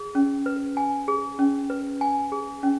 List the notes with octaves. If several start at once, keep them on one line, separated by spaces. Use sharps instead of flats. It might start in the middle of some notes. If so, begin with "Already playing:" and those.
Already playing: G#4
C#4
B4
G#5
G#4
C#4
B4
G#5
G#4
C#4